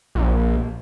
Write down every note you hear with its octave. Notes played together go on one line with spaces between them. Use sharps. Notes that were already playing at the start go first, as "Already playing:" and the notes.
A#1